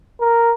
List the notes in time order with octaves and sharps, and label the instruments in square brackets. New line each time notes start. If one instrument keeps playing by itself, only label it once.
[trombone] A#4